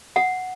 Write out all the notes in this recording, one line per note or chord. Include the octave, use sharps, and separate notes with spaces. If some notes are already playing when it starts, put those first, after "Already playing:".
F#5